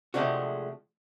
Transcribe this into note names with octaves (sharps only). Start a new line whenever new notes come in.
C3 F3 G#3 A3 D4 F#4